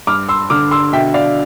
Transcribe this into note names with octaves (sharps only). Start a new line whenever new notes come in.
G2 D6 F6
C6 E6
D3 D6 F6
C6 E6
B2 E5 G5
D5 F5